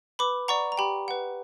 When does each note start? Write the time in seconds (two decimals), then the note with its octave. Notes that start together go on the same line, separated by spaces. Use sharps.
0.19 B4 B5 D6
0.48 D5 F#5 A#5 C#6
0.72 A#5
0.77 G4 G5 B5
1.08 B4 F#5